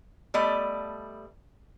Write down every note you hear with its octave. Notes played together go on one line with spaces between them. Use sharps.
G3 A3 B3 D5 D#5